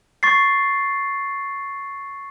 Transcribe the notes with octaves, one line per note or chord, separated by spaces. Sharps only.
C#6 A6 C7